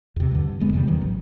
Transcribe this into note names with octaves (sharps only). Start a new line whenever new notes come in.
E2 C3
G2 D3
D#1 G#3 B3
E2 C3 D#3 G3
D#3 E3 F#3
A1